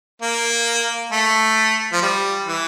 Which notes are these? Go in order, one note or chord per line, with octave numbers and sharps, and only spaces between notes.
A#3
A3
F3
G3
E3